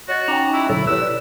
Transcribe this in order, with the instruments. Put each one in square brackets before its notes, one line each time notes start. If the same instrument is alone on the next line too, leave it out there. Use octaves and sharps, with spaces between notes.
[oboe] F#4 [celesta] C#5 D#5 A6
[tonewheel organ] C#4 D#4 A#5 [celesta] G5 C#6 D6
[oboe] E4
[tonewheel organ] B2 D3 F#3 [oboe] E4 [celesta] A6
[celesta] E4 G4 C#5 [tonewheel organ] B4 [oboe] E6
[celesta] D5